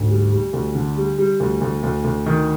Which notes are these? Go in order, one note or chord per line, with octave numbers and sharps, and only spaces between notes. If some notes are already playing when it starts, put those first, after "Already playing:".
Already playing: D2 G#2
G3
G3
D2
D3
G3
G3
D2
D2
D2
D2
D#3